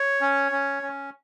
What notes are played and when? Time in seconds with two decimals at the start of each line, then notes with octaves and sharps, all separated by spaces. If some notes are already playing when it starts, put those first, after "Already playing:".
Already playing: C#5
0.21 C#4
0.52 C#4
0.83 C#4